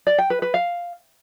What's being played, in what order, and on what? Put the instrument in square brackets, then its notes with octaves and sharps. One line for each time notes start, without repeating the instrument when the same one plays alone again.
[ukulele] D5
G5
B4
B4
F5